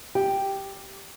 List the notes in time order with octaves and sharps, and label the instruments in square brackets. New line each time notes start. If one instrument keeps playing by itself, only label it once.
[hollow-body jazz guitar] G4